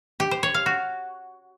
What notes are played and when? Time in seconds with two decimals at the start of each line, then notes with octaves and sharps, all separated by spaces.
0.20 G4
0.31 C5
0.43 C#5
0.54 F5
0.66 F#4